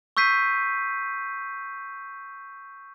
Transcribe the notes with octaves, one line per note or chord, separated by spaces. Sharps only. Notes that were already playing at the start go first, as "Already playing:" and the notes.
C#6 E6 G6 B6 C7 D#7